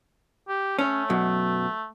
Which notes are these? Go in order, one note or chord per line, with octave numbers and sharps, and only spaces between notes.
G4
A3 C#4
F#2 B2 F#3